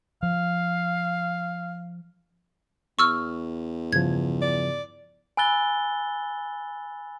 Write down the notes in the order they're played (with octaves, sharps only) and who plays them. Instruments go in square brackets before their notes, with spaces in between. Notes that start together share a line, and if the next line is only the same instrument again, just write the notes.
[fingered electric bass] F3 [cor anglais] F5
[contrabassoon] E2 [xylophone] C#6 E6 F6
[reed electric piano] G2 C#3 F3 [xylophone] G#6
[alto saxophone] D5
[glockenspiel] G#5 B5 E6 F#6 A6 G7